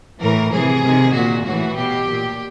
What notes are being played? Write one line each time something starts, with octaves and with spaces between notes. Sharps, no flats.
A2 E3 A#4
C3 E3 G#4
C3 D#3
A#2 F#4
A2 E3 F#4
B2 G4
A#2